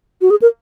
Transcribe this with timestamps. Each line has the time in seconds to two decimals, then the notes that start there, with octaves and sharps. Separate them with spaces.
0.21 F#4
0.30 G#4
0.42 A#4